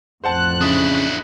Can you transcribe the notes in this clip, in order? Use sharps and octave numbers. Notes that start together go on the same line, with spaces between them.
A1 F2 C5 F#5 A5 F#6
C#3 D4 E4 D#6